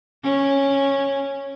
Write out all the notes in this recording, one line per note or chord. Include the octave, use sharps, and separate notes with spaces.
C#4